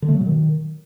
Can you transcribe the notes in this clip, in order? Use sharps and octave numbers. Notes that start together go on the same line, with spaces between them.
D3
A3
F#3
B2
D#3